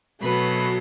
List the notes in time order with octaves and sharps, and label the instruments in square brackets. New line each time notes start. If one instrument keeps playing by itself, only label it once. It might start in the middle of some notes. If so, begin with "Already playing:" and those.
[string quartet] B2 F#3 A3 B4